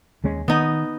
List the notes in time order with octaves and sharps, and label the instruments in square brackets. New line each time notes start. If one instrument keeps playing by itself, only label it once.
[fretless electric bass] D#2 G#3 C#4
[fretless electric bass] D#3 [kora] B3 D#4